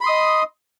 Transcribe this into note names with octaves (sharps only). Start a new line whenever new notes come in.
D#5 B5 C6 D#6